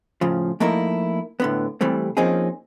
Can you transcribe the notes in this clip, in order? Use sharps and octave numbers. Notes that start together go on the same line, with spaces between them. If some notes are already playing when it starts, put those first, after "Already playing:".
A2 C#3 F3
F3 A3 A#3 D#4 E4 A#4
A2 D3 B3
C3 E3 G3 A3 C4
F3 A#3 C4 C#4 D#4 G#4